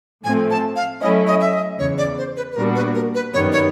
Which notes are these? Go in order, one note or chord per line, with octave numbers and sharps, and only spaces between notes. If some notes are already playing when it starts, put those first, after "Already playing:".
A2 F3 A3 C4 G#5
A5
F5
F#3 A3 C#4 E4 D#5
D#5
E5
D#5
E2 C#3 E3 C#5
D5
C5
B4
B4
A#2 G3 B3 D4 F#4 A#4
B4
A#4
B4
F#2 D#3 G3 B3 C#5
C#5